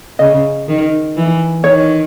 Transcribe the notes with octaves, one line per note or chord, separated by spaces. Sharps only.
C#3 D#5
D#3
E3
D#3 C#5